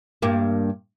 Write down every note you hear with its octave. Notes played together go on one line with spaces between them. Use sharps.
G2 A#3